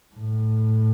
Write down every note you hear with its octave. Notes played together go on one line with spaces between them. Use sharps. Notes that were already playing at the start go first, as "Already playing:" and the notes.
A2